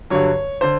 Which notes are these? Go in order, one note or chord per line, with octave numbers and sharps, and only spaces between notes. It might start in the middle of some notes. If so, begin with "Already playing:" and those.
G2 D3 F#3 C#5
D3 C5